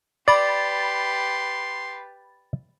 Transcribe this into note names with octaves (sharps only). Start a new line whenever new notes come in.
G4 B4 D5 B5 C6 A6